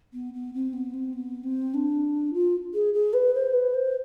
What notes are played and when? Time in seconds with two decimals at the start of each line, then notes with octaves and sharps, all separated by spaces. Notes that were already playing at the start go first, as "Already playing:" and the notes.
0.13 B3
0.33 B3
0.53 C4
0.73 B3
0.93 C4
1.13 B3
1.43 C4
1.74 D4
2.33 F4
2.74 G#4
2.94 G#4
3.13 B4
3.34 C5
3.53 B4
3.74 C5